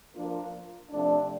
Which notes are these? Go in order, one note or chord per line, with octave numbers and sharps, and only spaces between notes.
F3 A#3 D4 F4 A#4
C3 F3 A3 D4